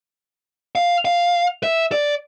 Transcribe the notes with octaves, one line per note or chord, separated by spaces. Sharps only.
F5
F5
E5
D5